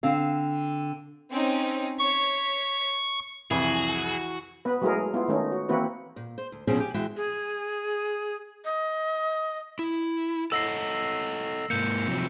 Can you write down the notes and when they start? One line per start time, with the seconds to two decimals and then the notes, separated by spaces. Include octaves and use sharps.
0.03 D3 C4 F5
1.30 C4 C#4 D#4
1.99 C#5 C#6 B6
3.51 C2 F2 E3 F#4 G#4
4.65 B3 B4
4.82 F#3 G#3 A3 E4 G#4 A#4
5.14 B3 E4 F4
5.28 D#3 A3 C#4 D#4
5.52 F#4
5.69 E3 A#3 C4 E4 F#4 B4
6.16 A#2
6.38 C5
6.52 D2
6.67 E2 B2 F3 C4 C#4 G#4
6.80 G4 G#5
6.94 E3 G#3 F#4 E5 G5
7.17 G#4
8.65 D#5
9.79 E4
10.52 A4 D#5 F#5 E6 A#6 C7
11.70 G#2 A#3 G6 C#7
12.08 C3 F3 F#3